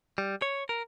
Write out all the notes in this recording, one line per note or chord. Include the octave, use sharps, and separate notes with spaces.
G3
C#5
A#4